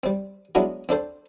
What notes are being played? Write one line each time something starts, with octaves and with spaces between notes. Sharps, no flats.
G3 C4
F#3 G#3 B3 D4 E4 F#4
C4 D4 A4 C5